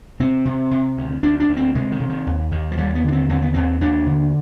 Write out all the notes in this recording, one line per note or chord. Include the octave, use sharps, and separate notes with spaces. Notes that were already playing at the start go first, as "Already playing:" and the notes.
C3 C4
C3
C3
D2
D2 D4
D4
D2
C4
C3 G#3
D#3
C3
D#3
D#2
D#2 D#3
F3
D#2 G3
B3
D3 D4
C4
D#2 C4
B3
D#2 C4
D#2 D4
D3